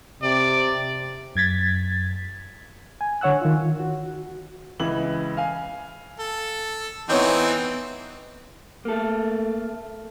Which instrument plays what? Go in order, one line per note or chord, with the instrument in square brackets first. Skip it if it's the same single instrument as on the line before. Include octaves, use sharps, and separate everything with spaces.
[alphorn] C3 [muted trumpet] D5
[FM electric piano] F#2 G#6 A6 B6
[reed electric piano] G#5
D3 C#5 F#5 E6 F#6
D#3 F4
F#4
[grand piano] C#2 E3 F#7
F5 G#5
[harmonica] A4
[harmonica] E3 C4 D#4 [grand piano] B3 C#5 G6
[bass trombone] A3 [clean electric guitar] A#3 A4